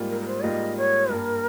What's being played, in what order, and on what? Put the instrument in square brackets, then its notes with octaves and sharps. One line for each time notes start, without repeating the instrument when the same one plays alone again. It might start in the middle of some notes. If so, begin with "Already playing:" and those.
Already playing: [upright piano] G#2 G3 A#3 F4
[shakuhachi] A#4
A#4
C5
[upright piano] G#2 G3 A#3 F4 [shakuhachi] D#5
[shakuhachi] C#5
[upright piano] G2 G3 A#3 [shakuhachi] A#4